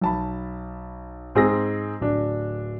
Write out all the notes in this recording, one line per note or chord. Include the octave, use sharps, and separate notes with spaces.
B1 A5 B5
G#2 C4 G#4 E6 A#6
D1 D4